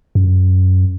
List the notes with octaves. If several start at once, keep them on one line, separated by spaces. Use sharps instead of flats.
F#2